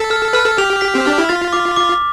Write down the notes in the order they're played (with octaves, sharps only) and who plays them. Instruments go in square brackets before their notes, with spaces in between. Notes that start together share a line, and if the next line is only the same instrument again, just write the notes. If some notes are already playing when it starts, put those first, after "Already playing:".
Already playing: [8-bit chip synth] A4 [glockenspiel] B6
[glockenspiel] F6
[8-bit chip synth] B4 [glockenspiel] F6
[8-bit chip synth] A4
[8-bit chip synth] G4 [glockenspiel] F7
[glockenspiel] B6
[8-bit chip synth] C4
[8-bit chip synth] D4 [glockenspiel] F6
[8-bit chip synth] E4
[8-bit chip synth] F4 [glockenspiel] A6
[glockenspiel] D6
D6